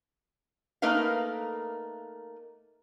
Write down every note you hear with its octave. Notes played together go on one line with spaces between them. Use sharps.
A3 A#3 D#4 A#4 B4 F5